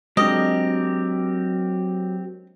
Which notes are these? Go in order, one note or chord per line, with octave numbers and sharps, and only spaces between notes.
F#3 G#3 C4 D4 G4 A#4 D#5